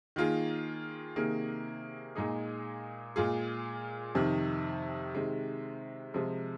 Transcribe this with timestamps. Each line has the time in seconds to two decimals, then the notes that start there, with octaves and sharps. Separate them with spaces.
0.16 D#3 A#3 F4 G#4
1.16 C3 D#3 A#3 G#4
2.15 A#2 G#3 D#4 G#4
3.16 A#2 G#3 F4 G#4
4.15 F2 C3 D#3
5.15 C3 D#3 G#3
6.14 C3 F3 G#3